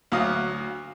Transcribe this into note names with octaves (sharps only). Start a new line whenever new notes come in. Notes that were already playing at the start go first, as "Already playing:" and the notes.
D2 F#3 F5 D#6